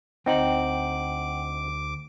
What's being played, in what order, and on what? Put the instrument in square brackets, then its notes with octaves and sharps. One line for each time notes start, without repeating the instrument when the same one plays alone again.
[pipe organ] D2 D6 [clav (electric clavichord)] C4 D#4 [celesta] F#5 G5 F#7